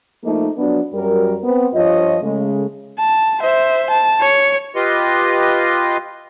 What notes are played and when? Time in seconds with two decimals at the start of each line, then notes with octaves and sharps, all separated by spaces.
0.24 F3 A3 A#3 D#4
0.57 F3 F#3 B3 D4
0.93 F#2 F#3 G3 A#4
1.43 B3 C4
1.74 G2 F3 F4 C#5 D#5
2.22 C#3 G#3 A3
2.99 A5
3.40 C5 E5
3.91 A5
4.20 C#5 C#7
4.76 F4 G4 B4 D#5 C6